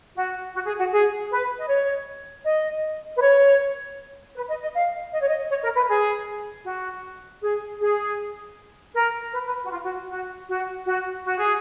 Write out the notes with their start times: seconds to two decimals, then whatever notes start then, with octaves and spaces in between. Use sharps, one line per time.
0.16 F#4
0.54 F#4
0.67 G#4
0.79 F#4
0.92 G#4
1.31 B4
1.59 D#5
1.68 C#5
2.45 D#5
3.16 B4
3.21 C#5
4.36 B4
4.49 D#5
4.62 D#5
4.74 F5
5.12 D#5
5.21 C#5
5.29 D#5
5.51 C#5
5.64 A#4
5.76 B4
5.89 G#4
6.65 F#4
7.42 G#4
7.80 G#4
8.95 A#4
9.33 B4
9.46 B4
9.64 F#4
9.71 F4
9.84 F#4
10.09 F#4
10.48 F#4
10.86 F#4
11.24 F#4
11.39 G#4